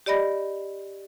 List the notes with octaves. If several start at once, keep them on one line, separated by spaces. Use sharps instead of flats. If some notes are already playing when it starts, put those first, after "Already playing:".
G4 D5 D#5 B5 A#6